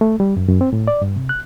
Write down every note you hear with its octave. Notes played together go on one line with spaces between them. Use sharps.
A3
G3
F#2
F#2
C4
A2
D5
G2
C3
F#6